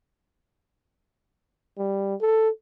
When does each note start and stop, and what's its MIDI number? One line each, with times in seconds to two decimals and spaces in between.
1.78 2.15 55
2.21 2.50 69